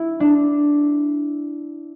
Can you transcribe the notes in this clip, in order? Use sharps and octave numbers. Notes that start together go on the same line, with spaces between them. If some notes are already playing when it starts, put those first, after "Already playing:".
Already playing: E4
D4